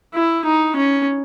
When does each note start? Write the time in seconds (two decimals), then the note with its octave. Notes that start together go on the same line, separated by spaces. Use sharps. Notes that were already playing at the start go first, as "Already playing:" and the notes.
0.14 E4
0.45 D#4
0.76 C#4